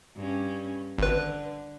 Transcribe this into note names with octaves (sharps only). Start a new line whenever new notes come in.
G2 C#4
G#1 D3 B4